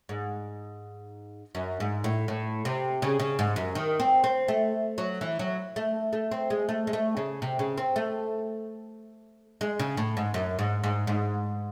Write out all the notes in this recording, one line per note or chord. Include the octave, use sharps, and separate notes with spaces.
G#2
F#2
G#2
A2
A2
C3
C#3
C#3
G#2
F#2
D#3
C4
C4
A3
F#3
E3
F#3
A3
A3
C4
G#3
A3
G#3
A3
C#3
C3
C#3
C4
A3
G#3
C#3
A2
G#2
F#2
G#2
G#2
G#2